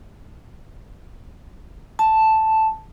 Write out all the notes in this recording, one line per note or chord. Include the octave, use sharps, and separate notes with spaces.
A5